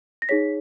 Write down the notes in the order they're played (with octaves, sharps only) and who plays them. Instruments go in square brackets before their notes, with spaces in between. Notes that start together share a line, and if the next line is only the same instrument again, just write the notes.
[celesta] A#6
D#4 G#4 C#5 B6